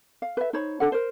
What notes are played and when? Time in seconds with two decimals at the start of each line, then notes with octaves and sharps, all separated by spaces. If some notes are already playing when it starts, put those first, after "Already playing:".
0.22 F5
0.37 B4 E5
0.53 D#4 C5 C#5 B5
0.80 D4 A4 F#5
0.92 A#4 C5